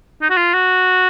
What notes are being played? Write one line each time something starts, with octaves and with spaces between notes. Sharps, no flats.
D#4
F#4
F4
F#4